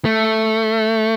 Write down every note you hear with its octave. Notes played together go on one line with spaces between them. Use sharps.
A3